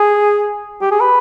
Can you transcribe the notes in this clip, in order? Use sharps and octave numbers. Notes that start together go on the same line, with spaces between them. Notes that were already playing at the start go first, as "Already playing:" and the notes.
Already playing: G#4
G4
G#4
B4